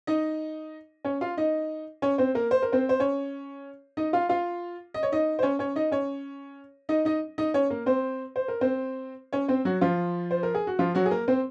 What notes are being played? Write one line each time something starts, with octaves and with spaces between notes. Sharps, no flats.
D#4 D#5
C#4 C#5
F4 F5
D#4 D#5
C#4 C#5
C4 C5
A#3 A#4
C5
A#4
C4 C5
C5
C#4 C#5
D#4 D#5
F4 F5
F4 F5
D#5
C#5
D#4 D#5
C5
C#4 C#5
C#4 C#5
D#4 D#5
C#4 C#5
D#4 D#5
D#4 D#5
D#4 D#5
C#4 C#5
A#3 A#4
C4 C5
C5
A#4
C4 C5
C#4 C#5
C4 C5
F#3 F#4
F3 F4
C5
A#4
G#4
F#4
F3 F4
F#3 F#4
G#4
A#3 A#4
C4 C5